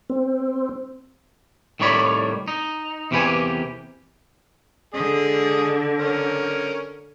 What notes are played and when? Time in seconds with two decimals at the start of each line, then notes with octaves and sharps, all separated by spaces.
0.10 C4
1.80 C2 A2 D#3 C#5 D5 B5
2.48 D#4
3.11 E2 C3 A#3 G4 B4 G#5
4.94 D3 G#4 D#5
5.99 C#4 A#4